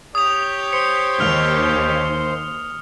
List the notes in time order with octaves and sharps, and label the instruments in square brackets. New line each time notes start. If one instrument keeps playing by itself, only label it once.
[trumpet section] G4 C#5 [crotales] D#6 F7
[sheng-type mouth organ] C5 [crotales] C#7
[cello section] D#2 [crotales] F6 F7